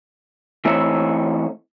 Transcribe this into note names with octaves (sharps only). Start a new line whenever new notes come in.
E3 A3 C4 D#4 C#5 E5